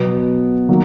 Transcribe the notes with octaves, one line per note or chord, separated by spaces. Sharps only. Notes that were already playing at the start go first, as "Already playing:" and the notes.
Already playing: B2 F#3 B3
D#3 F#3 A#3